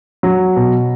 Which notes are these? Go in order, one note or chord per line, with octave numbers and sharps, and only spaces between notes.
F#3
B2